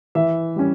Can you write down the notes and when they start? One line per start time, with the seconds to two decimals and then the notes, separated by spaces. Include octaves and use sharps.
0.15 E3 E5
0.56 G3 C#4